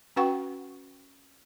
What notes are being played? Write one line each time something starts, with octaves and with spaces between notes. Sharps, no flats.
C#4 F#4 B4 F#5 G5 C#6